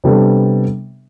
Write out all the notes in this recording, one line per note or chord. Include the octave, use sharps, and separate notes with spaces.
C3 G3 B3 D4 A4